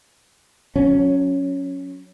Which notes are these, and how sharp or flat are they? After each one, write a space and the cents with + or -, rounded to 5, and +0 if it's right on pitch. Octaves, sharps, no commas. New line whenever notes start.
F#3 -25 C#4 +0